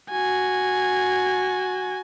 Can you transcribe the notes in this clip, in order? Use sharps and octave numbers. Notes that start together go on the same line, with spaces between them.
F#4 G#5